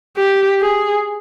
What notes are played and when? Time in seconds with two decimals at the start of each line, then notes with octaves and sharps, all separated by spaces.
0.17 G4
0.61 G#4